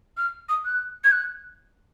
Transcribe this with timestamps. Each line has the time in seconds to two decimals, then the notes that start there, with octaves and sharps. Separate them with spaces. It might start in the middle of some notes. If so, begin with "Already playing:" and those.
0.17 F6
0.49 D#6
0.65 F#6
1.04 G#6
1.12 F#6